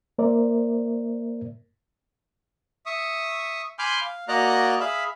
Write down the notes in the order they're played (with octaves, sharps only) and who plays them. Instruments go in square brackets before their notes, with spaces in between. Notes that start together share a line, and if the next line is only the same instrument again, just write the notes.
[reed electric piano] A#3 A#4 C5 D5 E5
[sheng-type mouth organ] E5 C#6 D#6
G#5 B5 C6 D6 F6 G6
F5
A#3 F#4 D5 D#5 A#5 F#6
G#4 E5 F5 B5